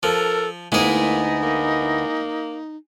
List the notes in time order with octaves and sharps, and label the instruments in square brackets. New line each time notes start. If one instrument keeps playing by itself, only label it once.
[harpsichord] F3 [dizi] A4 [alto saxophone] A#4
[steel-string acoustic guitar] D2 B3 E4 [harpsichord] G#3 G#4 [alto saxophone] A#3 [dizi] D#4
[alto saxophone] A#3